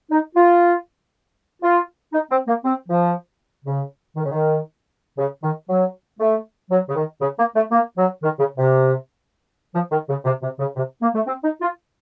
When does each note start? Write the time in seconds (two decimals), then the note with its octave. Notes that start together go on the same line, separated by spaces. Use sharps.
0.10 D#4
0.35 F4
1.63 F4
2.13 D#4
2.31 C4
2.48 A#3
2.64 C4
2.89 F3
3.65 C#3
4.16 D#3
4.24 C#3
4.32 D#3
5.18 C#3
5.43 D#3
5.69 F#3
6.20 A3
6.70 F#3
6.88 C#3
6.95 D#3
7.21 C#3
7.38 A#3
7.55 A3
7.71 A#3
7.97 F#3
8.23 D#3
8.39 C#3
8.57 C3
9.75 F3
9.91 D#3
10.09 C#3
10.25 C3
10.43 C3
10.59 C#3
10.77 C3
11.01 A#3
11.14 A3
11.26 C4
11.43 D#4
11.61 F4